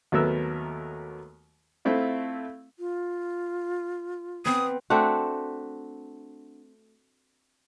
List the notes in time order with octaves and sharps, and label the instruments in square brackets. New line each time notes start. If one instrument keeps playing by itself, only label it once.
[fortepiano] D#2 F#3 A3 B3 A#4 E6
A3 C4 E4 F4
[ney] F4
[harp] B3 C4 [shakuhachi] D#6
[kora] A3 C4 D4 F#4